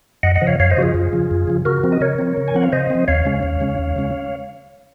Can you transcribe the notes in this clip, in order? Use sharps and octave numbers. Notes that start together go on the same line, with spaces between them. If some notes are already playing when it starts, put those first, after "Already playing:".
F#2 D#5 F#5
D#5 F#5
C#3 F3
C#5 F5
F#2 C#5 F5
C5 D#5
C#3 F3 F4 F#4 G#4
F#2
C#3 F3
F#2
C#3 F3
C#3 F#4 A#4
F3 C4
D#5
C#3 A#4 C#5
F3 C4
C#3
G#5
F3 C4 F#5
F5
C#3 C5 D#5
F3 C4
D#2 C#5 F5
C#3 G#3 C#4
D#2
C#3 G#3 C#4
D#2
C#3 G#3 C#4